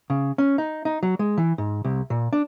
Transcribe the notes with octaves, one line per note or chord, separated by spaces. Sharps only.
C#3
C#4
D#4
D#4
F#3
G#3
E3
G#2
C2
A#2
D4